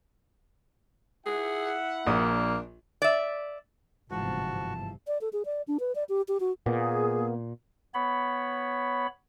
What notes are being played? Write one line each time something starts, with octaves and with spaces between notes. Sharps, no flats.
E4 G#4 E5 F#5
A#1 A#3 D4 D#6
D5 E5
G1 G#2 C3 E3 F3 F#4 A5
D5
A4
G#4
D5
D4
B4
D5
G4
G4
F#4
A#2 A#3 B3 G#4
B3 C#5 B5